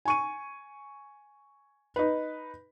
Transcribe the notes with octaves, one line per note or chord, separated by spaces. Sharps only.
G#5 C#6 D#7
D#4 B4